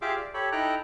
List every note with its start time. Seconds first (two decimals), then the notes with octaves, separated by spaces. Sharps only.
0.02 F4 G4 G#4 E5 F5 D6
0.16 D5
0.34 G4 A4 C#5 B5
0.52 D#4 E4 A4 G5 A#5 F#6